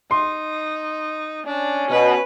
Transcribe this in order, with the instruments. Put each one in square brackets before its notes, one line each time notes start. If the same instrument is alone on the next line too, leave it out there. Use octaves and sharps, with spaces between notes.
[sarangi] D#4 [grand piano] C6
[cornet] C#4 [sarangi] D4
[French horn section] B2 [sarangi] B4